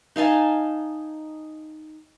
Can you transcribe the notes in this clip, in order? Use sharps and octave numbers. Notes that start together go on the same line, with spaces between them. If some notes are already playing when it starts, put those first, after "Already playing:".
D#4 F5 G#5 A5